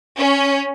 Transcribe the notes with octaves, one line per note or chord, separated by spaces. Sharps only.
C#4